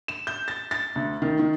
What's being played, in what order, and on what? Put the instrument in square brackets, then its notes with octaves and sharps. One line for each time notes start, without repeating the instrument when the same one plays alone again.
[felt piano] E7
G6
A6
A6
D2
D#3
D#3